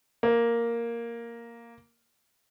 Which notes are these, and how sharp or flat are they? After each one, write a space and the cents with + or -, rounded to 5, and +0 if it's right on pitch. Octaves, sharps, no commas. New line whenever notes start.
A#3 +0